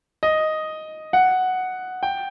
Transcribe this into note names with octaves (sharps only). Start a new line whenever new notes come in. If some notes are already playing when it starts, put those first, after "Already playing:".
D#5
F#5
G5